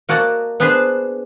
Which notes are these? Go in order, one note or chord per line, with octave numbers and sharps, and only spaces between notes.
A#3 F#4 D5 D#5 A5
B3 D4 G#4 B4 C5